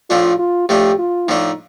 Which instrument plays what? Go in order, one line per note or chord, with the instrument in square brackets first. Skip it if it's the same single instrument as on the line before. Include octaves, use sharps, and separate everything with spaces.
[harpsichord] A2 F3 A3 D4 [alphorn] F4
[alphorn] F4
[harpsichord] A2 F3 A3 D4 [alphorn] G4
[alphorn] F4
[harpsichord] A2 F3 A3 D4 [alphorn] D#4